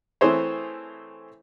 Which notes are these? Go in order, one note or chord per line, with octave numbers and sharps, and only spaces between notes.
E3 A3 C4 G#4 C5 C#5